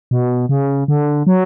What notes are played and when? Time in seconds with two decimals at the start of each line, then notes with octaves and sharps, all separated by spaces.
0.11 B2
0.49 C#3
0.88 D3
1.27 F#3